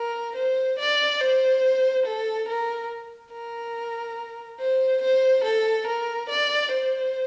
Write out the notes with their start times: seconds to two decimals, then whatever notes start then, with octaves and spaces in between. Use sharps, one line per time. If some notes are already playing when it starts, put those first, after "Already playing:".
Already playing: A#4
0.36 C5
0.79 D5
1.21 C5
2.06 A4
2.48 A#4
3.32 A#4
4.60 C5
5.02 C5
5.44 A4
5.87 A#4
6.29 D5
6.71 C5